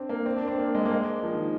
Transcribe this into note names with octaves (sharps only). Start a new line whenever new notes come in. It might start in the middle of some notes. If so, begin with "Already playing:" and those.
Already playing: C4 D4
A#3
C4
D4
C4
A#3
G#3
A#3
G#3
F3
D#3